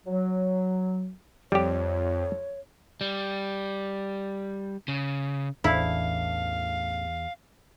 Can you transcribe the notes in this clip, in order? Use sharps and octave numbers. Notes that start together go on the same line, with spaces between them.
F#3
F2 G3 G4 C#5
G3
C#3
A1 E2 A3 D4 E4 F5